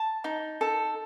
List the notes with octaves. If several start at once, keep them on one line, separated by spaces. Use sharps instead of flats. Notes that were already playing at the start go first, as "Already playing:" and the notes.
Already playing: A5
D#4
A4